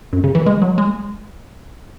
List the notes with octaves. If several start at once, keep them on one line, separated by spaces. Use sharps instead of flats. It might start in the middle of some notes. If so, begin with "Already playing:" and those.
F#2
C#3
E3
G#3
F#3
G#3